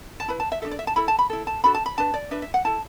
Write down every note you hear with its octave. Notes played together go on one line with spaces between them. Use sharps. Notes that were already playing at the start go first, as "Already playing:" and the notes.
A5
E4 B4 B5
A5
E5
D4 F#4 A4 E5
D5
E5
A5
E4 A4 B5
A5
B5
E4 A4
A5
D4 F#4 A4 B5
A5
B5
D4 B4 A5
D5
D4 B4 E5
E5
F#5
E4 A4 A5